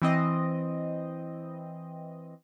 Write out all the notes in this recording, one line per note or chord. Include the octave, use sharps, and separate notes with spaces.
E3 C4 D#5